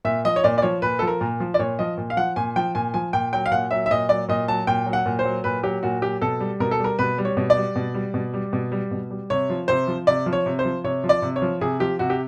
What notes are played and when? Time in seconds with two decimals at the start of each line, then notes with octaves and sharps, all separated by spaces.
0.05 A#2 E5
0.25 F3 D#5
0.36 C#5
0.44 A#2 D5
0.58 D5
0.62 F3 C#5
0.82 A#2 B4
0.99 F3 A4
1.07 A#4
1.21 A#2
1.40 F3
1.54 D5
1.59 A#2 C#5
1.79 F3 D#5
1.98 A#2
2.10 F5
2.17 F3 F#5
2.36 A#2 G#5
2.56 F3 G5
2.75 A#2 G#5
2.94 F3 G#5
3.13 A#2 G5
3.33 F#3 G5
3.46 F5
3.51 A#2 F#5
3.71 F#3 E5
3.86 E5
3.91 A#2 D#5
4.09 F#3 D5
4.29 A#2 D#5
4.48 F#3 A5
4.67 A#2 G5
4.86 F#3
4.93 F#5
5.06 A#2
5.19 C5
5.25 F#3
5.44 A#2 B4
5.63 F#3 G4
5.83 A#2 F#4
6.02 F#3 G4
6.22 B2 A4
6.40 G3
6.60 B2 A#4
6.71 A4
6.80 G3 A#4
6.99 B2 B4
7.18 G3
7.25 C#5
7.37 B2
7.50 D5
7.57 G3
7.76 B2
7.94 G3
8.14 B2
8.34 G3
8.53 B2
8.72 G3
8.91 B2
9.11 G3
9.30 C3 C#5
9.50 F3
9.68 C3 C5
9.87 F3
10.07 C3 D5
10.26 F3
10.33 C#5
10.46 C3
10.59 C5
10.65 F3
10.84 C3 C#5
11.04 F3
11.09 D5
11.22 C3
11.36 C#5
11.42 F3
11.61 C3 G#4
11.80 F3 G4
11.99 C3 F#4
12.10 G4